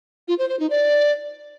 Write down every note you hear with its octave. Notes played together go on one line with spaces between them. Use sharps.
F4
C5
C5
D#4
D5